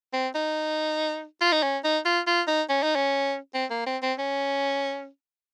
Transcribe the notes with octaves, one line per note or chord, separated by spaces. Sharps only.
C4
D#4
F4
D#4
C#4
D#4
F4
F4
D#4
C#4
D#4
C#4
C4
A#3
C4
C4
C#4